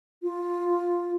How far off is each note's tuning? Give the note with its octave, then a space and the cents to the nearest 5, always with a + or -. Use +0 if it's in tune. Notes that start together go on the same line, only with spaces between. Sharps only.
F4 +5